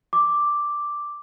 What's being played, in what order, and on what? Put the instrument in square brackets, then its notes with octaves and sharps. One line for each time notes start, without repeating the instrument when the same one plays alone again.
[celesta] D6